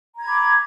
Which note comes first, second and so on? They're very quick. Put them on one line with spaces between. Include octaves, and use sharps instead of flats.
A#5 G#6 B5 D6